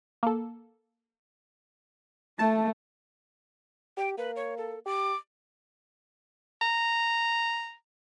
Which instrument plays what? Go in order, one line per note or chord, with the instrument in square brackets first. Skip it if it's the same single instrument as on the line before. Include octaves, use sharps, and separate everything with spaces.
[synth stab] A#3 A4
[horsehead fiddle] A3 [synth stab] A5
[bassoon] G4 [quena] G5
[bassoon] A#3 [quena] B4
[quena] C#5
A4
[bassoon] G4 [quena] D6
[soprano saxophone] A#5